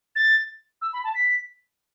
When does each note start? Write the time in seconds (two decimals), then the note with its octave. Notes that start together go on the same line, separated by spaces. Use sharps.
0.16 A6
0.82 E6
0.93 B5
1.04 A5
1.15 B6